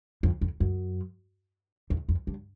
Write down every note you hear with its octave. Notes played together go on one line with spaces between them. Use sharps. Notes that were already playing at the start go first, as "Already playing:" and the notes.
F2
F2
F#2
E2
F2
G2